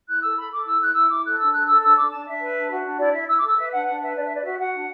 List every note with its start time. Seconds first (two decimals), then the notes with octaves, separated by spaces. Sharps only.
0.07 E4 F#6
0.22 A4 E6
0.37 A4 B5
0.51 A4 D6
0.66 E4 E6
0.80 E4 F#6
0.95 E4 E6
1.09 E4 D6
1.24 A4 F#6
1.38 D4 E6
1.52 A4 F#6
1.65 A4 E6
1.82 D4 E6
1.96 D4 D6
2.11 D4 A5
2.26 D4 E5
2.40 B4
2.55 D4
2.70 F#4
2.84 D4
2.98 E4 D5
3.13 E4 E5
3.27 E4 E6
3.37 D6
3.42 A4 E6
3.56 B4 E5
3.71 D4 F#5
3.85 D4 F#5
4.00 B4 E5
4.14 D4 D5
4.24 E5
4.29 B4 D5
4.43 F#4 E5
4.58 F#4 F#5
4.72 D4